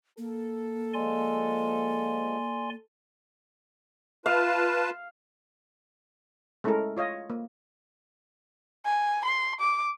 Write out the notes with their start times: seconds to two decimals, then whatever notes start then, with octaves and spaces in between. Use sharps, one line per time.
0.18 A#3 A4
0.94 F3 G#3 D5 G#5 C6
4.26 F4 B4 F5 A5
6.64 G#3 A3 C#4 E4 A4 A#4
6.97 F4 C#5 D#5 F5
7.30 A#3
8.85 G#5
9.25 C6
9.60 D6